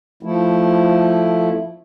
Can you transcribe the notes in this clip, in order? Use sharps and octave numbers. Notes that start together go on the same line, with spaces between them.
F3 A3 E4